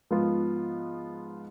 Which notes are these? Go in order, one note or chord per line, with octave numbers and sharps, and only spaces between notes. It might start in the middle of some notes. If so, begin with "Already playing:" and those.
G#2 F3 B3 F4